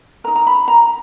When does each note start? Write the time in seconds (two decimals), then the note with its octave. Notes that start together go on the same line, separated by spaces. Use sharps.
0.24 A#4 A#5
0.28 D#4
0.36 A#5
0.47 B5
0.68 A#5